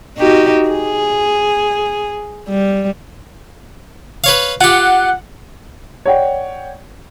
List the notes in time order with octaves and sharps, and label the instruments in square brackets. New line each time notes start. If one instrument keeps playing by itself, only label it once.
[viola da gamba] D#4 F#4 G4
G#4
G3
[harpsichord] B4 C#5 F5
[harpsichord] F4 G4 [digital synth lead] F#5
[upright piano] C#5 D5 F#5 G5